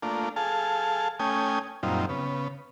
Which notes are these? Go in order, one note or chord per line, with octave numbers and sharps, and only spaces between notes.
A3 A#3 D4 F4
G#4 A4 F5 A5
A3 C#4 G5 G#5 D#6
F#2 A#2 G3 C4 D#4 F4
C#3 B3